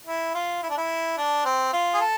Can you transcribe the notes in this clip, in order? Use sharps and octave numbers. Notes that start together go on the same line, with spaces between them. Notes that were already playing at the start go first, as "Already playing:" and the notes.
E4
F4
E4
D4
E4
D4
C4
F4
G#4
A4